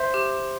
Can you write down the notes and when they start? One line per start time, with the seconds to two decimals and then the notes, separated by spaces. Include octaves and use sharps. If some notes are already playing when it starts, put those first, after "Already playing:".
Already playing: C5 E5
0.14 G4